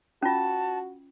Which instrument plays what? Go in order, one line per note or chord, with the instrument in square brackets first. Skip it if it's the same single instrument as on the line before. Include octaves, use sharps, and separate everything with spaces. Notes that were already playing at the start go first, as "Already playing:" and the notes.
[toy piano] C#4 F4 [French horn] F#4 [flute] A5